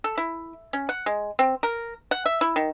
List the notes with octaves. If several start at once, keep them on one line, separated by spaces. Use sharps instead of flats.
A4
E4
C#4
F#5
G#3
C4
A#4
F#5
E5
E4
D#3